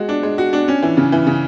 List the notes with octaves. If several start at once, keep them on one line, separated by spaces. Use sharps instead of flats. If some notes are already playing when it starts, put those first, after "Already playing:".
Already playing: G#3 F#4
D4
G#3
F#4
D4
C#4
E3
C#3
E3
C#3